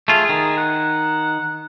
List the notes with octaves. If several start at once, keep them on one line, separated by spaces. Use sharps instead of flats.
A3 F4 G#4
D#3
F#5